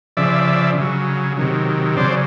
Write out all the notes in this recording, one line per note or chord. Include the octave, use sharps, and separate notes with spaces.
C#3 F3 D5 E5
C#3 F#3
C3 D#3 F#3
C#3 F#3 C5 D5